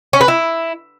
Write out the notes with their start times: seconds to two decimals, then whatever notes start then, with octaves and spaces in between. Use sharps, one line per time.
0.13 C#4
0.21 B4
0.28 E4